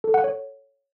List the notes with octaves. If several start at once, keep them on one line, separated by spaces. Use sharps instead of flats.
A4
F#5
C#5